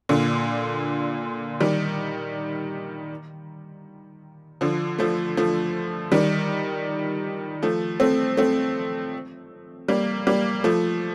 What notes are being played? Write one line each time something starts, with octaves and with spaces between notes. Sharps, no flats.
A#2 D3
D#3 G3
D3 F3
F3 A3
F3 A3
D#3 G3
F3 A3
A3 C4
A3 C4
G3 A#3
G3 A#3
F3 A3